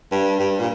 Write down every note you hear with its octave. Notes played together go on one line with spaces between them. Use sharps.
G2
G2
A#2